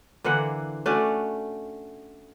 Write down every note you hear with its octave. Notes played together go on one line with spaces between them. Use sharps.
D3 E3 A#3 F#5
A3 C#4 D4 F#4